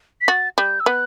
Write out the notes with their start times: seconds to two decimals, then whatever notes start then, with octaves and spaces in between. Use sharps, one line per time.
0.21 B6
0.28 F#4 A6
0.58 G3 G6
0.80 E6
0.86 B3 F#6